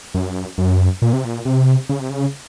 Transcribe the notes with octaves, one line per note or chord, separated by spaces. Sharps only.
F#2
F#2
A#2
C3
A#2
C3
C#3
C3
C#3